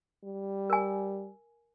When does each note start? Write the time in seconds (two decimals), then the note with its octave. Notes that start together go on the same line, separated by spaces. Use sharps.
0.24 G3
0.70 A#4 G#5